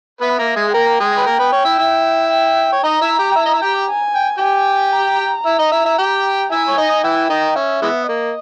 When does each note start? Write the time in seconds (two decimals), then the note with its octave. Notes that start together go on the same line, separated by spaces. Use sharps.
0.21 B3 B4 E5
0.39 A#3 A#4
0.56 G#3 G#4
0.68 G#4
0.74 A#3 A#4 G5
1.00 G#3 G#4
1.18 B4
1.26 A#3 A#4
1.39 B3 B4
1.52 C#4 C#5
1.65 E4 E5
1.79 E4 E5
2.31 G5
2.73 C#5
2.84 D#4 D#5 A#5
3.01 E4 E5
3.19 G4 G5
3.32 G5
3.36 E4 E5
3.46 D#5
3.54 E5
3.62 G4 G5
3.89 G#5
4.15 G5
4.38 G4 G5 G#5
4.93 A#5
5.46 E4 E5
5.59 D#4 D#5
5.72 E4 E5
5.85 E4 E5
5.98 G4 G5
6.51 E4 E5 G#5
6.68 C#5
6.77 D#4 D#5
7.03 E3 E4 G5
7.29 D#3 D#4
7.56 C#4 E5
7.82 E3 G#3 B3
8.08 A#3 D#5